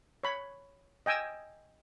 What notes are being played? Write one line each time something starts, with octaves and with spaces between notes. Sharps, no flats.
C#5 B5
D#5 G5 G#5 E6